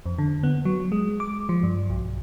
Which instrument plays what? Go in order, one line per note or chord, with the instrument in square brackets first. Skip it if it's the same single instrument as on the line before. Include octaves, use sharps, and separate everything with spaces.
[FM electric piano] F2
D3
B3
F#3
G#3
D6
F3
G2
B1